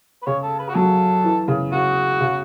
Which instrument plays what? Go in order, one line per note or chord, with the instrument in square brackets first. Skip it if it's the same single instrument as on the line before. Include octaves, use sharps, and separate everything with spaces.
[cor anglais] B4
[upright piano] C#3 [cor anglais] C#5
[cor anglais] A4
B4
F#4
[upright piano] F#3 [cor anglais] A4
[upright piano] E3
C#3
[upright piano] C#3 [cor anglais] F#4
[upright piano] C#3